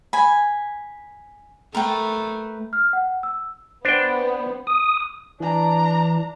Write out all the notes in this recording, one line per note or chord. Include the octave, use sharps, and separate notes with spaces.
G#5 B5
A3 A#4 B4 G5
F6
F#5
E6
B3 D4 C5 G5
D#6
E3 D4 A#5